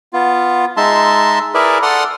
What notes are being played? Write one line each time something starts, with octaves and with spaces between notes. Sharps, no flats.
B3 F4
G#3 D#4 E5 A5 C6
E4 G#4 A#4 B4 D5 E5
A4 D5 F#5 C6 D#6 F6